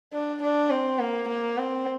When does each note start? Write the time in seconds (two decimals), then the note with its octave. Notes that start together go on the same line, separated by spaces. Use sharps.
0.13 D4
0.42 D4
0.70 C4
0.99 A#3
1.28 A#3
1.57 C4